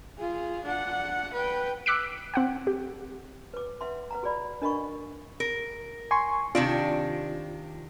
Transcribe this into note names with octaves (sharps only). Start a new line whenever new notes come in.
F4 G#4
D4 F#5
B4 G5
D6 E6 F#6 B6 C#7 D7
C4 F#5 G5
G4
B4 D6
B4 E5 F#5 C6
B4 F#5 A#5
F#4 G#4 B4 D5 B5
D4 A#4 D#5 F#5 B5 C#6
A#4
G#5 C6 C#6
C3 D#3 D4 F4